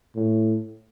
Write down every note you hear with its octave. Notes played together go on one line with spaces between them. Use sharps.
A2